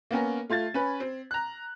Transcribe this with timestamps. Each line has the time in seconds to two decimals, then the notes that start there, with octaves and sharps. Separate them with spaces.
0.11 A#3 B3 C#4 A#4
0.50 A3 F4 G#6 A6
0.74 C#4 B4
1.00 C4
1.31 A#5 F#6